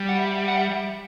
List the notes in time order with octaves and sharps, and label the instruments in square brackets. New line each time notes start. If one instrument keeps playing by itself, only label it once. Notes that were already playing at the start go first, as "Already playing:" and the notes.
Already playing: [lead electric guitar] G3
[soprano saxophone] F#5
E5
F#5
E5